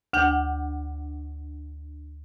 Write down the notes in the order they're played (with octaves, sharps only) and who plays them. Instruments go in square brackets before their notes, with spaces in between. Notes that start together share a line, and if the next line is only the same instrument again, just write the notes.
[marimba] D2 D4 F#5 G5 G6